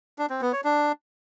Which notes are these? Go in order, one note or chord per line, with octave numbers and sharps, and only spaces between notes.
D4
C4
B3
C#5
D4